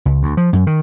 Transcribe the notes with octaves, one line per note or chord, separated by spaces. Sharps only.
C#2
D2
F3
F#2
D#3